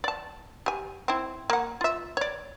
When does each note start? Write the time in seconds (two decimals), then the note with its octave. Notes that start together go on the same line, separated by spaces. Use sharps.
0.04 D5 A5
0.66 G4 G#5
1.08 C4 E4
1.50 A#3 F#5
1.81 F4 E5
2.17 C#5 D5